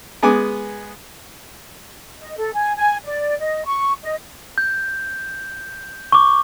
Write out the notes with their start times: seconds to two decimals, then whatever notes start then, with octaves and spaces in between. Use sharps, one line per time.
0.23 G#3 B3 G#5 D6
2.19 D#5
2.37 A4
2.53 G#5
2.76 G#5
3.04 D5
3.39 D#5
3.64 C#6
4.02 D#5
4.58 G6
6.12 C#6 D6